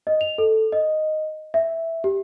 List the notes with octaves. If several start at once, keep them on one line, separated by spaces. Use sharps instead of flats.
D#5
F7
A4
D#5
E5
G4